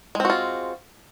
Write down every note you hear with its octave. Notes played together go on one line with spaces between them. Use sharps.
G#3 C4 F4 F#4